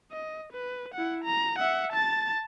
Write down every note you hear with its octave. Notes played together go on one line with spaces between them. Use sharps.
D#5
B4
E4 F#5
A#5
E5 F#5
A5 A6